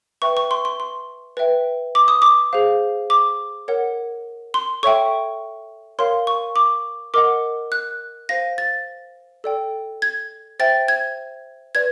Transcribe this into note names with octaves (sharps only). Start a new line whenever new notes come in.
B4 E5 G5 C#6
C#6
C6
C6
C6
B4 E5 G5
D6
D#6
D6
G#4 C5 F5
D6
A#4 C#5 F#5
C6
A4 C#5 E5 G5 C#6
A#4 C#5 F5 C6
C#6
D6
A#4 D#5 F#5 D6
F#6
C5 F5 A#6
A6
A4 D5 G5
G#6
C5 E5 G5 A6
G#6
B4 D5 G#6